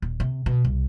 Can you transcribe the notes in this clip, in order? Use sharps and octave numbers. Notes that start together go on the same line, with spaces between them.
D#1
C3
B2
C2